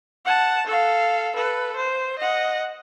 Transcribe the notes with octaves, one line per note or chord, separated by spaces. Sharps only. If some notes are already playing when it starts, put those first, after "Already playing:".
F#5 A5
A4 F5
A4 B4
C5
D#5 F#5